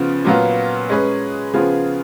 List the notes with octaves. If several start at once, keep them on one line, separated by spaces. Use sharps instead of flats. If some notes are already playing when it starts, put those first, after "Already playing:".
Already playing: C#3 F3 B3 F4
A#2 F#3 B3 F4
G#3 C#4 G#4 B4
C#3 F3 B3 F4 G#4